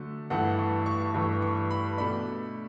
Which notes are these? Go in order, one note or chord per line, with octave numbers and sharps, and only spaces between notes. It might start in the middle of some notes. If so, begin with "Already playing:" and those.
Already playing: D3 F#3 A3
G2 E3 A3 F#5
C#6
C#6
G2 E3 A3 C#6
C#6
B5
B2 A3 D4 B5